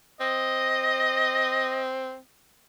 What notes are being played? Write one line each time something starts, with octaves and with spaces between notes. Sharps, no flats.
C4 D#5